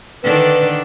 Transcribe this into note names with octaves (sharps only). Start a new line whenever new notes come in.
D3 D#3 D4 B4